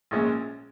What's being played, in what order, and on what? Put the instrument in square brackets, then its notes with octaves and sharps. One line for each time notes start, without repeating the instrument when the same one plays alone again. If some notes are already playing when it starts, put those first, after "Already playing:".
[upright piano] A#1 A#2 G#3 C#4